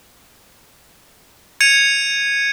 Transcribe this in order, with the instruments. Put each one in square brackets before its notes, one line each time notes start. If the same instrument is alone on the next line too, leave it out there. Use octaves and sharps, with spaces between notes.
[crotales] G#6 C#7 D#7 F7